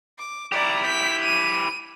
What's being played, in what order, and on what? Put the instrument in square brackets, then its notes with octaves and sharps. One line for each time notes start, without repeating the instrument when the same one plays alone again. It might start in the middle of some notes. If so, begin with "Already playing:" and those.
[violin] D6
[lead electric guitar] E4 G4 [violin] D5 A#5
[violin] G6 B6
D#7